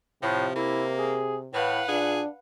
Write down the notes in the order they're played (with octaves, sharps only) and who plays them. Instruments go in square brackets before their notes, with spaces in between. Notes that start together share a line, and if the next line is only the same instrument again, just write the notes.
[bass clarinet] A2 [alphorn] C3 [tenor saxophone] F3
[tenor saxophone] A#3 [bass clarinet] E4
[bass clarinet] G#4
[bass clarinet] A2 [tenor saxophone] E3 [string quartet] B4 F5 F#5
[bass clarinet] A#2 [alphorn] D4 [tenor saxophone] G#4